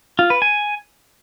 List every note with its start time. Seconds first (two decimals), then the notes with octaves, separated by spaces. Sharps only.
0.19 F4
0.30 B4
0.42 G#5